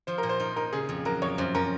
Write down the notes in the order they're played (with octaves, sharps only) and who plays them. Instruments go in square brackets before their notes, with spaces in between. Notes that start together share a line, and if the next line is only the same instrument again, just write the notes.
[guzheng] F3 [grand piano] C5
[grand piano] A#4
[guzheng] A#2
[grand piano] C5
[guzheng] D#4
[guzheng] D#4 [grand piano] A#4
[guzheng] C#3 [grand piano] G#4
[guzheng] F2
[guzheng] F#3 [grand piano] A#4
[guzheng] F2 [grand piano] C#5
[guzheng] F#2 [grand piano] C5
[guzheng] C#4 [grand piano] A#4